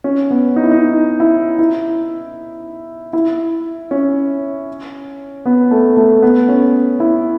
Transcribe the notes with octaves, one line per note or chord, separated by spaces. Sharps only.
C#4
B3
D#4
E4
D#4
E4
E4
E4
C#4
B3
A3
A3
B3
C#4
E4